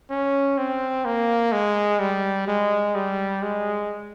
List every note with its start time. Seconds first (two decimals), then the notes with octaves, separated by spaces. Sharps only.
0.10 C#4
0.58 C4
1.05 A#3
1.52 G#3
2.00 G3
2.47 G#3
2.95 G3
3.42 G#3